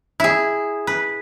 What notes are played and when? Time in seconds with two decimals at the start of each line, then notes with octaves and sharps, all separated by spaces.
0.20 E4 G#4
0.87 B4